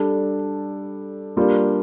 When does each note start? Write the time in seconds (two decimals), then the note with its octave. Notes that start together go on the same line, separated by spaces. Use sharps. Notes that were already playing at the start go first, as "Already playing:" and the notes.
Already playing: G3 D4 A4
1.36 G3 A#3 D4 F4